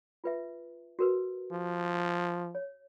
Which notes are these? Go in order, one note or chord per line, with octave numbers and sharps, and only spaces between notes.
F4 B4 E5
F#4 A#4 B4
F3
C#5